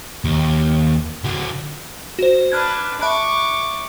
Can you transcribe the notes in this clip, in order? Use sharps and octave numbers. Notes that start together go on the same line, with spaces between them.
D#2
D3 F#3
F#4 C5
D4 B4 F6 F#6 G#6
E5 B5 C#6 D6 F#6